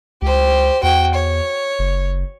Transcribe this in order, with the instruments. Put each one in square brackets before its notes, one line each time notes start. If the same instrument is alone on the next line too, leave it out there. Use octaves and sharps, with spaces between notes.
[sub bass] C#2 [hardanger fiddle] G4 C5
[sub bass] E2 [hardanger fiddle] F#4 G5
[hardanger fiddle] C#5
[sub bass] F#1